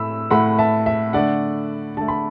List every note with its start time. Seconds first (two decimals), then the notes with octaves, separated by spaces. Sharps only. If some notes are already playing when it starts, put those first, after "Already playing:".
Already playing: A2 A3 B5 E6
0.30 A2 A3 F#5 B5
0.58 E5 A5
0.86 E5
1.13 D3 A3 D5 F#5
1.97 D3 A3 A5
2.08 B5